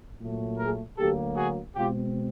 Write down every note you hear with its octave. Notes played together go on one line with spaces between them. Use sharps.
A#2 F#3 A3
G#4 A#4
D2 D3 F#3 A#3 G4 A4
F#4 G#4
B2 G#3 C4 F4 G4